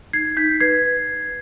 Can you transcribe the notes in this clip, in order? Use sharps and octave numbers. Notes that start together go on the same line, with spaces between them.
D#4 G#6 C7
D#4 G6 B6
B4 G#6 C7